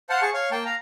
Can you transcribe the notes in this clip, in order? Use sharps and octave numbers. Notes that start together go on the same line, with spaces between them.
C5 F5 F#5 A5
G#4 A5 C#6
C#5 F5
A#3 G5 A5
F5 A#5